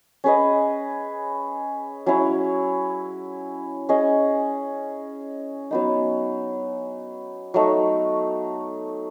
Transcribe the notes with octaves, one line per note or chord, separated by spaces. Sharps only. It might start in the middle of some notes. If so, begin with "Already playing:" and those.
C#4 G#4 B4 D#5
F#3 C#4 E4
C#4 G#4 D#5
F#3 B3 D#4
F#3 A3 D#4